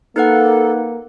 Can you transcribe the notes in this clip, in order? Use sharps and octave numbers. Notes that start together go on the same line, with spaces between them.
A#3 D#4 A4 B4 F#5